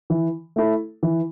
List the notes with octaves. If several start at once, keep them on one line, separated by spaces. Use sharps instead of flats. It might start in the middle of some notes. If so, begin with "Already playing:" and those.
E3
A3 E4 A4
E3